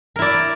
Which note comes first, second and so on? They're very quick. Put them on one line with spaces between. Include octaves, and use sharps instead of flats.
A#4 E4 D5